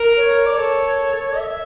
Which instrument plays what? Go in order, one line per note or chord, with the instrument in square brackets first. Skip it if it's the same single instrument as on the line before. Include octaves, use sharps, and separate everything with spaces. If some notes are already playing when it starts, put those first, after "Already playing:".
Already playing: [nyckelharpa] A#4
[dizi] C#5
D5
[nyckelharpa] A4 [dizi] C#5
[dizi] E5